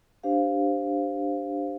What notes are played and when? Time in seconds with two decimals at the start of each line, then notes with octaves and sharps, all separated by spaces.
0.24 D4 G4 C5 F5